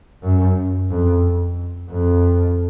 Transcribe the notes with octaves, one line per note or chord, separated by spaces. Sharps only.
F#2
F2
F2